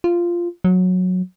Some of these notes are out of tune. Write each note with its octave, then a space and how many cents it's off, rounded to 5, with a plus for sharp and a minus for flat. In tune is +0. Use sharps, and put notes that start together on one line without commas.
F4 -10
F#3 -15